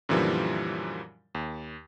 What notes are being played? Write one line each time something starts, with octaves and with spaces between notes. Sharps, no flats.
F#2 A#2 D3 E3 F3 G3
D#2